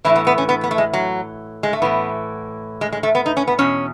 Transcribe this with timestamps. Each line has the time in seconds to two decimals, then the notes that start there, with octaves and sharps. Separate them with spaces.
0.05 A2 E3 E4
0.16 B3
0.27 B3
0.38 C#4
0.49 B3
0.64 B3
0.71 A3
0.78 G#3
0.93 F#3
1.63 G#3
1.73 A3
1.82 A2 E3 B3
2.81 G#3
2.93 G#3
3.03 A3
3.15 B3
3.26 D#4
3.37 C#4
3.48 B3
3.59 E2 B2 C#4